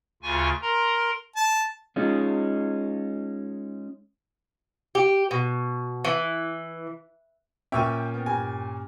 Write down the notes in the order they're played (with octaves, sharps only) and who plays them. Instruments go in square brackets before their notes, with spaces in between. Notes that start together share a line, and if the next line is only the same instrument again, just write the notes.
[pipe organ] D2 C#3 F4 G#5 C#6
A#4 A#5 C6
[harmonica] A5
[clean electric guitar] G#3 C#4 D#4 F4
[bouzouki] G4
B2
E3
[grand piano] A#2 C#4 [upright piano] E5 C#6 D#7 [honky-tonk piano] G5
[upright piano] B3
[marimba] G2 [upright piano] G#5